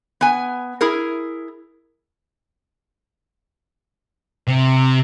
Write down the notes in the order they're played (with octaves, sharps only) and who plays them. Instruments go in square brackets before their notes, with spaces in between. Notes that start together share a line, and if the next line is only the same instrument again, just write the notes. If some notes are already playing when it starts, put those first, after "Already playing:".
[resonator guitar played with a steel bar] B3 G#5
E4 G#4 A#4
[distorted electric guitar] C3